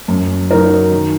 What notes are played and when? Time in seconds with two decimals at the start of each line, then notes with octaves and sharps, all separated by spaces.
0.08 F#2
0.51 F#3 D#4 A#4
0.92 D#3